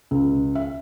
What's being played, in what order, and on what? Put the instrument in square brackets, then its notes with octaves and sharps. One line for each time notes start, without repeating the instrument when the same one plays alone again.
[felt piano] C#2
E5